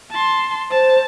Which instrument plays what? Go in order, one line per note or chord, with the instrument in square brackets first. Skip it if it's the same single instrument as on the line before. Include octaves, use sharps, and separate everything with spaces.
[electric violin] A5 C6
[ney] C5 [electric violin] A5